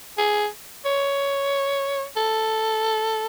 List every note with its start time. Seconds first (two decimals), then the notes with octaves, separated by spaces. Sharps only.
0.18 G#4
0.85 C#5
2.16 A4